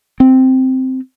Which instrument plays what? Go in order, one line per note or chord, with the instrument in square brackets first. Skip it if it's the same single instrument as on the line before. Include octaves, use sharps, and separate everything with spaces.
[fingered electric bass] C4